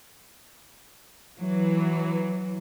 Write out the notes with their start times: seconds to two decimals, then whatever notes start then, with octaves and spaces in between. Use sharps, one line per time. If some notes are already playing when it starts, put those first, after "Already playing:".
1.40 E3 F#3